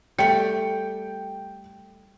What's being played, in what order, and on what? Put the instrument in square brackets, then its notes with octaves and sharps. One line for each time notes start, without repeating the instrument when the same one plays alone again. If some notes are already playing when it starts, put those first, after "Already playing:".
[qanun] G3 A3 [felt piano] G5 C#7